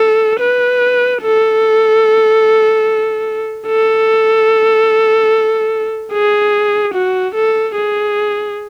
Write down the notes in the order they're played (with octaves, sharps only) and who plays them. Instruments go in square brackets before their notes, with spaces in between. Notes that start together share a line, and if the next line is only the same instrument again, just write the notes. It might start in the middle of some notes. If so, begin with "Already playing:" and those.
Already playing: [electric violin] A4
B4
A4
A4
G#4
F#4
A4
G#4